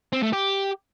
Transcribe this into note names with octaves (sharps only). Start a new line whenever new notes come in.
C4
A3
G4